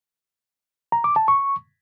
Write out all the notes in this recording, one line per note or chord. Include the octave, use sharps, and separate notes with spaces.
A#5
D6
A5
C#6